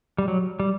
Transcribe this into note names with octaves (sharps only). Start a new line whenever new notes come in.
G3
F#3
G3